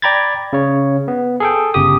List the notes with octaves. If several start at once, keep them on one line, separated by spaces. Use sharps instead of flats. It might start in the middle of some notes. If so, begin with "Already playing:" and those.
D5 G5 A#5 B5 G#6 A6
C#3 C#5
B3
G#4 A4 G5
G1 C#3 G4 D#6